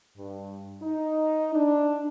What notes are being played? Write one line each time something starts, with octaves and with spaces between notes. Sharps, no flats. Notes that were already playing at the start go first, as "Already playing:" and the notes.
G2
D#4
D4